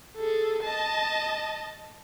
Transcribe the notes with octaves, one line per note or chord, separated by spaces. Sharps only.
G#4 A4
D#5 A5